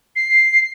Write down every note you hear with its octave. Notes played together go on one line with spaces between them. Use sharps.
C7